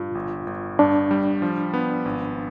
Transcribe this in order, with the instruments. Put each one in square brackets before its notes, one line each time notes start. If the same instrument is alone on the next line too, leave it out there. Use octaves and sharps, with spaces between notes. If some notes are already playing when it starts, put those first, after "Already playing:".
Already playing: [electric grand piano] G2 [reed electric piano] F4
[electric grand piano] G1
G1
[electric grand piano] G2 [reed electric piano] D4
[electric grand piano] G3
F3
B3
G#1